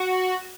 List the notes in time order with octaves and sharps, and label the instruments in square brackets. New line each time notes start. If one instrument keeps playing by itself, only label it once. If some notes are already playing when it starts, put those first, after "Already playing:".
Already playing: [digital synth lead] F#4